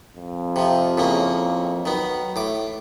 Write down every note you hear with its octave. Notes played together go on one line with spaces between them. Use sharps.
F2
C3 F3
A2 C#3 A#3
D#3 F#3 B3
A2 A3 D6